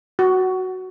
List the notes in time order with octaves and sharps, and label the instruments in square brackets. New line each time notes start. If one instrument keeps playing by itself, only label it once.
[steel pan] F#4